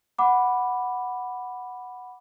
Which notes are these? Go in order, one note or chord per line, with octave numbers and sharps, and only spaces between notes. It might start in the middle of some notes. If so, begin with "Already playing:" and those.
F#5 B5 D6